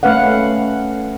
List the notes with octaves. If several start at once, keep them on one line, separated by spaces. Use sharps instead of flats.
A3 C#4 B4 F5 F#5